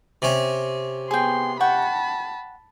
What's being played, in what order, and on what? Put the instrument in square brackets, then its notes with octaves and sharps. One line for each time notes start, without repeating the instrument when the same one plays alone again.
[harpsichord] C3 C#4
[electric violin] B3 C6 [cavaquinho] G#4 G5
[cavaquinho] F#5 G5 C#6 [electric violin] A5 B5